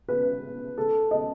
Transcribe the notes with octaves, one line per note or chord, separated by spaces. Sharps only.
B4
A4
D#5